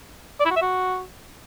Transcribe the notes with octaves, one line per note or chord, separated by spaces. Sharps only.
D5
E4
F#4
E5
F#4